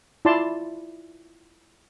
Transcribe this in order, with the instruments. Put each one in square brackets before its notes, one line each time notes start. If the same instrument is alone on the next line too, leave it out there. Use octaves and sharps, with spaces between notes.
[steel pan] E4 F4 D5 A5 C6